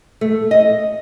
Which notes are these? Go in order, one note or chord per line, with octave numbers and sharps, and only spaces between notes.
A3
D#5